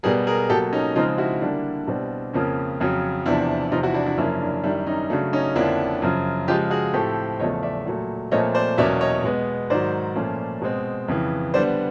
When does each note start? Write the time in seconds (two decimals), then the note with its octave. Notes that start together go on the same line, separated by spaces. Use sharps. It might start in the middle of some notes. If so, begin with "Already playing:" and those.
0.03 B2 G3 B3 G#4 A#4
0.27 G#4 A#4
0.49 B2 F#3 A#3 G4 A4
0.73 C#4 D#4
0.96 C#3 F3 G#3 C4 D#4 F4
1.18 E4 F#4
1.42 D3 G3 A#3 D4 E4
1.87 B2 G3 C4
2.34 F2 C#3 F3 A#3 C#4
2.80 F2 C#3 F#3
3.26 E2 C3 F3 D4 E4
3.71 E2 C3 F3 D#4 F4
3.83 E4 F#4
3.94 D4 E4
4.06 D4 E4
4.18 F#2 C#3 F3 A#3 C#4 D4 E4
4.41 D4 E4
4.64 F#2 D#3 G3 D4 E4
4.87 C#4 D#4
5.10 C#3 F#3 A3 D4
5.33 C#4 D#4
5.56 F2 D3 F3 A#3 C#4 D4 E4
6.02 F#2 C#3 F3
6.48 C#3 F3 G#3 F4 G4
6.71 F#4 G#4
6.94 A2 F3 A3 C4 G4 A4
7.39 E2 C#3 F3 A3 C#5 D#5
7.63 D5 E5
7.86 A#2 F#3 A3
8.32 A#2 F3 A3 C4 C#5 D#5
8.55 C5 D5
8.78 E2 B2 F#3 A#3 C#4 D5 E5
9.01 C#5 D#5
9.24 B2 G#3 B3
9.70 G#2 D#3 F#3 C5 D5
10.16 A#2 F3 A3 C#4
10.62 B2 G#3 C4
11.08 F2 C#3 E3
11.54 D3 G3 B3 C5 D5